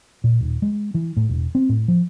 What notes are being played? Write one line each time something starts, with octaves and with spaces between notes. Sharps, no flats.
A#2
D#1
G#3
E3
A2
E1
C4
A2
F3